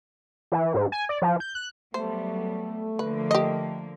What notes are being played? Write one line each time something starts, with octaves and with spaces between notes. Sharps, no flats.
E3
G#2
G#5
D5
F3
G6
F#6
F#3 G3 A3 B3 C5
D3 F3 A#3 B4
G4 D#5